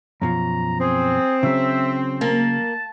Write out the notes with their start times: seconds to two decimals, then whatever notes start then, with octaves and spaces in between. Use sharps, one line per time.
0.22 F#2 B2 F3 A#5
0.81 C4 G#4
1.43 C#3 F#3 E5
2.21 A#3 A5